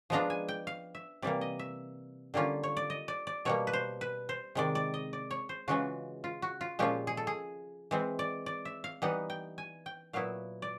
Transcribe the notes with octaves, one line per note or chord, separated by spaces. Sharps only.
F3 G#3 B3 D4 F4 A#5
G#5
G5
F5
E5
C3 E3 G3 A#3 D5
D#5
E5
D3 G3 A#3 C#4 F4
C#5
D5
D#5
D5
D5
B2 G3 A#3 C#5
B4
C5
B4
C5
C3 D#3 G#3 D5
D5
D#5
D5
C#5
C5
C#3 E3 G#3 C#4 F4 F#4
F4
F#4
F4
A#2 F3 G#3 C#4 F4 G4
G#4
A4
G#4
E3 G#3 C4
D5
D5
E5
F5
E3 G3 B3 D#4 F#5
G5
G#5
G5
A#2 F#3 B3 E4 F5
D5